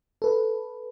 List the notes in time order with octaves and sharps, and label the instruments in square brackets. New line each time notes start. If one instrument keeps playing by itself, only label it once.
[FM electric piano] A4 B4